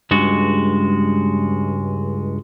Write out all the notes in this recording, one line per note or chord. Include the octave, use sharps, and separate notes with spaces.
C#2 G2 G#3 F#4